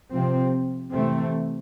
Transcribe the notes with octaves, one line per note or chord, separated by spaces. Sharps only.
C3 F3 C4
C3 E3 A3 C4